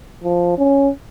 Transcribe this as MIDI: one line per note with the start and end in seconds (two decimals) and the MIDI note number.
0.24 0.58 53
0.58 0.89 61